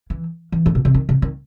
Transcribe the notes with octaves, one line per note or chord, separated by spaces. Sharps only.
E3
E3
A2
B2
C3
D#3
C3
D#3